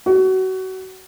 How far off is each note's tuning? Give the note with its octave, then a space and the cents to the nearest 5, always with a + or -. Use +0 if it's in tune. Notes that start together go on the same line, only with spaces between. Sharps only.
F#4 +25